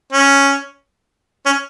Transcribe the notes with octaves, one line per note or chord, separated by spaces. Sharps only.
C#4
C#4